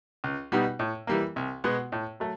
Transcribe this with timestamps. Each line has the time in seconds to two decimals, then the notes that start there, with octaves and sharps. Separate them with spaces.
0.24 C#2
0.52 B2 G3 B3 D#4
0.79 A2
1.07 E3 G3 A#3
1.36 C2
1.64 B2 G#3 B3
1.92 A2
2.20 F#3 A3